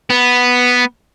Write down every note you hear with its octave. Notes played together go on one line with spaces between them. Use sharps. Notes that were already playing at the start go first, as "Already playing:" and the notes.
B3